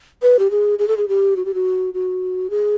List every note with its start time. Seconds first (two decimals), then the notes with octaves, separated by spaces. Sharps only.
0.22 B4
0.39 G4
0.51 G#4
0.79 G#4
0.88 A4
0.97 G#4
1.08 G4
1.36 F#4
1.45 G4
1.54 F#4
1.94 F#4
2.50 G#4